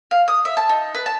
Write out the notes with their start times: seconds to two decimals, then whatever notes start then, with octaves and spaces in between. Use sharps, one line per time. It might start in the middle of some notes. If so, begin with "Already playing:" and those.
0.11 F5
0.28 D#6
0.45 E5
0.57 A5
0.69 D#4
0.95 B4
1.06 A5